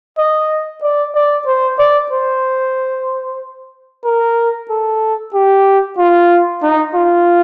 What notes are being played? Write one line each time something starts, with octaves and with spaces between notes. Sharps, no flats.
D#5
D5
D5
C5
D5
C5
A#4
A4
G4
F4
D#4
F4